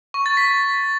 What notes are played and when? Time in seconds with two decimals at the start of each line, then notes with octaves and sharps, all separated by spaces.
0.14 C#6
0.26 A6
0.37 B6